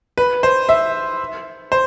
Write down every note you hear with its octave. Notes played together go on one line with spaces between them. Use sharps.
B4
C5
E5
C5